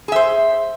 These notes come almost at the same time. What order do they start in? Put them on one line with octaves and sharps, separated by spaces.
G#4 E5 C5